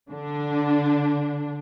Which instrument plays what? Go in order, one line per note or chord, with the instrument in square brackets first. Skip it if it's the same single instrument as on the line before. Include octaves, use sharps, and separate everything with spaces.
[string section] D3 D4